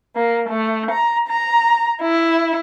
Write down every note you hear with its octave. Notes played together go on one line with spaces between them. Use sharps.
A#3
A3
A#5
A#5
E4